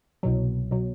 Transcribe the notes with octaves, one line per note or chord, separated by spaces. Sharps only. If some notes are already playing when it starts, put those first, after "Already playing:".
C2 B2 F#3
B2 F#3